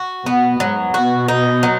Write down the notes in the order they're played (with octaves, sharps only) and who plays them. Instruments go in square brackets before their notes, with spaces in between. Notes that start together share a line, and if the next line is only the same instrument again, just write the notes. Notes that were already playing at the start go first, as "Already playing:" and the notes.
Already playing: [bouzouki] F#4
[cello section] B2 [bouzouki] B3
[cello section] G#2 [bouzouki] F#3
[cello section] B2 [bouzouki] F#4
[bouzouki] D#4
F#3